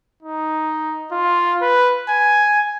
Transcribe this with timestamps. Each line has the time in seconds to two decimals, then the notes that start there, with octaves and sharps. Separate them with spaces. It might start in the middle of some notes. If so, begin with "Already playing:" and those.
0.23 D#4
1.12 F4
1.61 B4
2.09 G#5